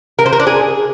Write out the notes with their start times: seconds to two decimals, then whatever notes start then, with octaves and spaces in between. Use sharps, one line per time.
0.19 A#4
0.26 C5
0.33 A#4
0.40 D4
0.47 G#4